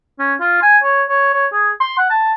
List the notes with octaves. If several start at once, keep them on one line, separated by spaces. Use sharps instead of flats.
C#4
F4
G#5
C#5
C#5
C#5
G#4
C6
F#5
A5